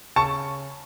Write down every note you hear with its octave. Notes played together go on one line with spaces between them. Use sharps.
C#3 A5 C#6